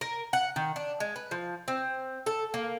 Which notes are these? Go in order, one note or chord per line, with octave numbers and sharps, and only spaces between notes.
A#4
F#5
D#3
D4
G#3
B4
F3
C4
A4
A#3